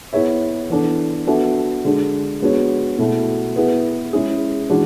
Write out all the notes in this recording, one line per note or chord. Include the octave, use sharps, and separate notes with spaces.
B3 E4 G#4 C#5 E5
E3 B3 D4 A4
B3 D4 F#4 A4 E5
D3 G#3 D4
G#3 B3 D4 F#4 C#5
B2 A3 E4
B3 E4 G#4 B4
G#3 C#4 E4 G#4
E3 G#3 D4 F#4